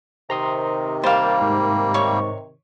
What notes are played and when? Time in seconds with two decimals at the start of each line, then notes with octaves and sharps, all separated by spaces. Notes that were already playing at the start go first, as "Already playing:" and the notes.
0.30 C3 D#3 A#5 C6 D#6
1.04 G3 A#3 C5 F5 G5 A6
1.41 G#2
1.94 C#5 C#6